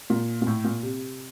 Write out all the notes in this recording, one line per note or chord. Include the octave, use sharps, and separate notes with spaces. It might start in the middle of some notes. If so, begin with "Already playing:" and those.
A#2
A#2
A2
A#2
C3